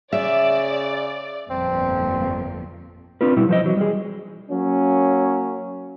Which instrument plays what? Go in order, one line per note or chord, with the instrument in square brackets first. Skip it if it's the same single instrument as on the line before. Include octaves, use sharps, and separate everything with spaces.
[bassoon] C#3 [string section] D5 [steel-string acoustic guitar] E5
[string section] G1 F2 A#2 [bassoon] C4
[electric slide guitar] C4 D4 F4 B4
B2 G3 E4
F3 C5 D#5
E3 F#3
G3 G#4
[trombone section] F#3 A#3 C#4